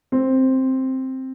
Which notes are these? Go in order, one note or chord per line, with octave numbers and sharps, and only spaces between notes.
C4